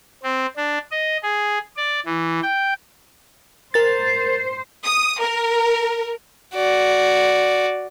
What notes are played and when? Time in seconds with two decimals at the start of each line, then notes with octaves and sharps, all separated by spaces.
0.23 C4
0.56 D4
0.91 D#5
1.23 G#4
1.77 D5
2.06 E3
2.43 G5
3.74 A#4 C5 A6
4.85 D#6
5.20 A#4
6.55 F#4 D5